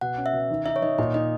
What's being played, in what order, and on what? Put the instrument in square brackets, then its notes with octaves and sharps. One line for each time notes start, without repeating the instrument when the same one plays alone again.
[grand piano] B2 [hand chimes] F#5
[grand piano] C#4
[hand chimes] E5
[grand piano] B2
D#3
[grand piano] D#4 [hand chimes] E5
[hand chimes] C#5
[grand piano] D#3 [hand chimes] D#5
[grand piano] A#2 [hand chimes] D#5
[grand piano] D#4 [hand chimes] D#5